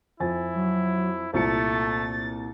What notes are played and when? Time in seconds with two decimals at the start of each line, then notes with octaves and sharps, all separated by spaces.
0.20 F2 E4 G#5 A6
0.55 F#3
1.34 C2 A#2 A3 A6 C#7